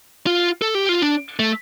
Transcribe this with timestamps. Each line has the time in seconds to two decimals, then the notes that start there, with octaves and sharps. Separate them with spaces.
0.26 F4
0.62 A4
0.75 G4
0.89 F4
1.02 D4
1.39 A3